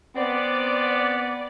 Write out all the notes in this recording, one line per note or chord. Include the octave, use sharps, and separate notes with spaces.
B3 C4 D5